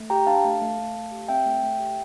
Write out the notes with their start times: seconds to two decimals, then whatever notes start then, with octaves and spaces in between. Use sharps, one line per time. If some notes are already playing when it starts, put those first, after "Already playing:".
Already playing: A3
0.10 G4 G5 A#5
0.27 D4 F5 A5
0.45 A3
0.62 A3
0.78 A3
0.95 A3
1.12 G4
1.28 C4 E5 G5
1.46 A3
1.63 A3
1.79 G4